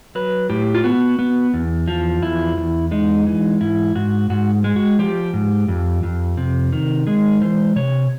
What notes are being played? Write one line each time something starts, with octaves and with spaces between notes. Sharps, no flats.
F#3 B4
A2 G4
F4
B3 F#4
B3
E2
F3
E2 E4
E2
G#3 D#4
E3
G#2 E4
G#2 F#4
G#2 F#4
G#3
F#4
F3 G4
G#2
F2
F2
C3
D#3
G#3 G#4
E3 C5
C3 C#5